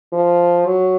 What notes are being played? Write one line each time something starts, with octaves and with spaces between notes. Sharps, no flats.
F3
F#3